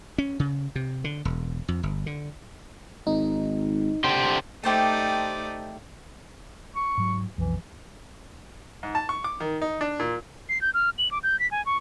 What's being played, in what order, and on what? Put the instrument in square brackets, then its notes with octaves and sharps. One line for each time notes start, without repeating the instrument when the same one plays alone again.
[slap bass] C#4
C#3
C3
D3
E1
F2
G1
D3
[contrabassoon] G#1 [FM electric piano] D#4
[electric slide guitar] D3 G4 C5 [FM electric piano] C6
[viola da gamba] A3 D#4 D5 [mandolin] G4 C5 A5
[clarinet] C#6
[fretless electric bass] G#2 F#3
[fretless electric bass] B1 F2 [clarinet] E3
[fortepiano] G#2
A5
C#6
D6
D#3
D#4
D4
A#2
[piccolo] C7
G6
F6
F#7
D6
G6
B6
G#5
C#6